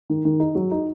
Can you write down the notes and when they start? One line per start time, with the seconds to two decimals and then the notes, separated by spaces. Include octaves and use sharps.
0.10 D#3
0.25 D#3
0.40 D#4
0.55 F#3
0.71 D#4